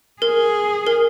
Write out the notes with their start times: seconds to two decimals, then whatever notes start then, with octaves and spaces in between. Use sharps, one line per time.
0.22 G#4 A#4
0.87 A#4